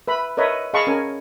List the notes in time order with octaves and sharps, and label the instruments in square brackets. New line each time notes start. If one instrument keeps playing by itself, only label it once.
[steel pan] B4 E5 B5
A#4 B4 C#5 D#5 E5
G#4 D#5 F5 A5 B5 C#6
C#4 A#4 C#5 G#5